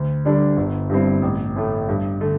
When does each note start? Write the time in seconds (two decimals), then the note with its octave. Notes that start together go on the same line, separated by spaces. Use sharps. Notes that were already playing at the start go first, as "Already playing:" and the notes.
Already playing: D2
0.25 D3 G3 D4 A4
0.57 G1
0.89 G2 G3 C4 E4
1.22 A1
1.56 A2 A3
1.89 G2
2.20 D3 A3